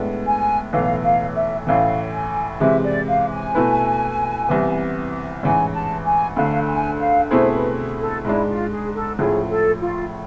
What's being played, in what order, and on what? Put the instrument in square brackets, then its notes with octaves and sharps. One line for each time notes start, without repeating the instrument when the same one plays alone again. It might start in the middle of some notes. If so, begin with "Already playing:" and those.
Already playing: [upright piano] A2 G#3 B3 D4
[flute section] G#5
[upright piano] B1 A2 E3 B3 [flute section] F5
[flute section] F5
E5
[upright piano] A1 A2 E3 [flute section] F5
[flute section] G#5
[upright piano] C3 E3 G#3 [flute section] E5
[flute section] D5
F5
G#5
[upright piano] B2 A3 E4 B4
C2 C3 E3 B3
[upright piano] A1 G#2 E3 [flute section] G#5
[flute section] A5
G#5
[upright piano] D2 D3 A3 [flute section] F5
[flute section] G#5
F5
[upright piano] B2 A3 C4 E4 G#4 [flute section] C5
[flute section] B4
A4
[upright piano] G#2 G#3 D4 [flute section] E4
[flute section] F4
G#4
A4
[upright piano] A1 A2 F3 [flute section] G#4
[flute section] A4
F4